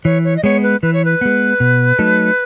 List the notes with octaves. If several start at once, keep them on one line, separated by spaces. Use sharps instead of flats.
E3 C#5
C#5
D#5
G#3 B3 C#5
B4
E3 B4
C#5
B4
G#3 B3
B2
F#3 A3 D#4 A4